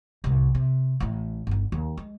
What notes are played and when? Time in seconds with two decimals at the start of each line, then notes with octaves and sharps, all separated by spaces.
0.24 C2 A2
0.55 C3
1.00 A1 A2
1.47 G1 D#4
1.72 D#2
1.97 G#3